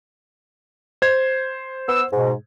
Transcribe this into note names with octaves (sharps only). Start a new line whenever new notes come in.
C5 G#6
B3 E6
G#2 B2